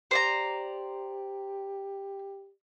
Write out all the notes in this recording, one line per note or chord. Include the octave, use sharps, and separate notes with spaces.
G4 C5 D5 A#5